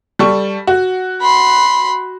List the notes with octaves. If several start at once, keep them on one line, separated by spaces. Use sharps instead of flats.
G3 A4 C#6
F#4
B5 C6